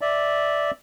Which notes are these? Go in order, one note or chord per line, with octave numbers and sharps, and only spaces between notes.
D5 E5